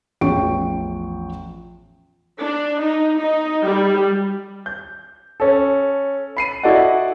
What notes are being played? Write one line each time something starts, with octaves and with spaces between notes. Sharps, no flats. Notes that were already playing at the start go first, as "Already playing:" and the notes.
A1 E2 F3 G5 C#6 D7
D4
D#4
D#4
G3
G6
C#4 A4
B5 C7 D#7
E4 F#4 A4 D5 D#5 F#5